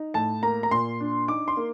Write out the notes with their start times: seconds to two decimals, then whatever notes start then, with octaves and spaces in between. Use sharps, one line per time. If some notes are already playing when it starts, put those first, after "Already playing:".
Already playing: D#4
0.14 A2 A5
0.43 A#3 A#5
0.63 A#5
0.71 A#2 C6
1.00 D4
1.28 D#4 D6
1.48 C6
1.57 A#3